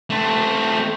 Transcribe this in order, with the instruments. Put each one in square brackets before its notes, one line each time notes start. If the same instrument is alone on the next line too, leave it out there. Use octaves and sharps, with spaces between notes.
[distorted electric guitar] A3 C4